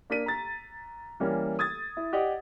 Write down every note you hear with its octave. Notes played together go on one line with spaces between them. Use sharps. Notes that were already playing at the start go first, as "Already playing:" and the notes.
A#3 D4 B6 D#7
A#5 A6
E3 G3 A#3 C#4
D#6 G#6 A6
E4
G4 D5 D#5 F#5